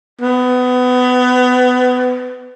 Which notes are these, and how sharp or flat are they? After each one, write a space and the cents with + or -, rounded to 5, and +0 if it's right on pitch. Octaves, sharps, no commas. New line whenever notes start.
B3 +25